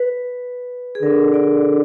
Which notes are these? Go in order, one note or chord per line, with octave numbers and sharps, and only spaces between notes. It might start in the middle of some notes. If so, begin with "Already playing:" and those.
Already playing: B4
G#4
D3 A#4
D5